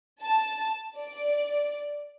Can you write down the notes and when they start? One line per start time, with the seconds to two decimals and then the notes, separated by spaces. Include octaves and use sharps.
0.23 A5
0.98 D5